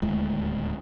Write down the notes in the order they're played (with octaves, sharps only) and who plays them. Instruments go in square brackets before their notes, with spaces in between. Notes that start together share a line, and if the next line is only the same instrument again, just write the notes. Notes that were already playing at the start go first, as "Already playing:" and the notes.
[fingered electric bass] D1 D#2 A2 G#3